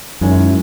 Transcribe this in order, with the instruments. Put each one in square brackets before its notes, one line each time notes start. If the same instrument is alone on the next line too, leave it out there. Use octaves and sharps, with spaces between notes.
[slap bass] F#2 [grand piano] D#3 G#3 C#4 E4